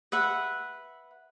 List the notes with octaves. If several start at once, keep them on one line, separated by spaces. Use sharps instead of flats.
B4 E5 F#5